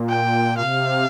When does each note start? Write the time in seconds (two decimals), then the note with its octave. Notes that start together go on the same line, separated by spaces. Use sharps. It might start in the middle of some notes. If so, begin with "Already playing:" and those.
Already playing: A#2
0.09 G5
0.56 C3 F5